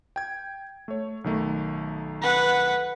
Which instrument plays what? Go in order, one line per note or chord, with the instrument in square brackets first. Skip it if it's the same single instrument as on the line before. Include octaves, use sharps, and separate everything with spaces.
[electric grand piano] G5 G#6
A3 C#5
B1 D#3 A3
[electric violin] B4 F#5